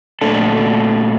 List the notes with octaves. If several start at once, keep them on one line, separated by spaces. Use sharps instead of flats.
A#2 A3 D4 A4